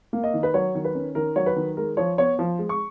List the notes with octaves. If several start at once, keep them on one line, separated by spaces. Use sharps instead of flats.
A#3
D#5
D#3
B4
F#3 C#5
D#3
B4
C#4
D#3 A#4
F#3 C#5
B4
D#3
G#3 A#4
F3 C#5
B3 C#5
F3
G#3
C#6